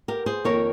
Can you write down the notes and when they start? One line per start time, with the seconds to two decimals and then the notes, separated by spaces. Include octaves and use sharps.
0.08 G4 A#4
0.26 G#4 C5
0.44 F2 D#3 A#3 A#4 C#5